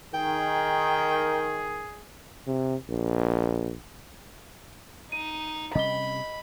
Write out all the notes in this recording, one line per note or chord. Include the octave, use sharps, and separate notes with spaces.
D#3 G#4 G5
C3
A#1
D#4 D#7
C3 G3 C#4 D#5 B5 G7